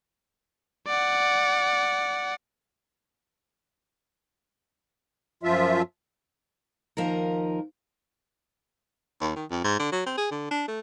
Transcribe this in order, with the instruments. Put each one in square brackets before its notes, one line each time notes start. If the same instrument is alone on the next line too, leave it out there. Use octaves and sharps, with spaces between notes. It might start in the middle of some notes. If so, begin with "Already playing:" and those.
[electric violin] D5 F#5
[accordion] F#2 F3 F4 E5
[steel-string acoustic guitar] D#2 F3 D#4 A#4
[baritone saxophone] D#2
D#3
F2
G#2
D3
F#3
C4
G#4
D3
D4
A3